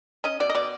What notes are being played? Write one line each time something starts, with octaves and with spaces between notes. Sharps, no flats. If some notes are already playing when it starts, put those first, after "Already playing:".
C#4 D#5
B2 D5
D#5
B2 D5